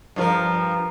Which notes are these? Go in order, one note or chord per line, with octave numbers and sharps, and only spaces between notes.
G2 F3 A#4